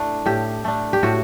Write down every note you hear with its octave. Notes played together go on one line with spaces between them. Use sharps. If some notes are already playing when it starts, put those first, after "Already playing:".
Already playing: A2 A3 D4
A2 G4
A3 D4
G4
A2 F#4